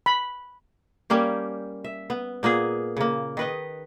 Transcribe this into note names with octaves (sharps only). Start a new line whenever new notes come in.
B5
G3 A#3 C#4 G4
E5
B3
A#2 A#3 B3 G#4
C#3 A#3
D#3 B4 D#5